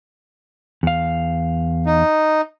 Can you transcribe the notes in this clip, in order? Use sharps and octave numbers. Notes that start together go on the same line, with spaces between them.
E2 F5
D#4